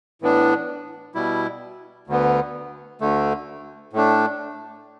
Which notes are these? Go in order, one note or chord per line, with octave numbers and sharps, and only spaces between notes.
A2 E3 B3 D4
B2 G3 E4
D2 D3 B3
D2 D3 A3
A2 A3 D4